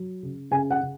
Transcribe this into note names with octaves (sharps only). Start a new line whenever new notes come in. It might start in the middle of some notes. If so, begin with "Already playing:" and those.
Already playing: F#3
C#3
C#3 G#5
F#5
C#3